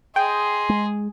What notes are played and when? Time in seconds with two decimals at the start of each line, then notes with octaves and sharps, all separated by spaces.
0.16 G#4 D#5 G5 C6
0.69 G#3